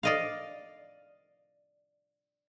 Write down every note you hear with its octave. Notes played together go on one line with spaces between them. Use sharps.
D5 D#5 F5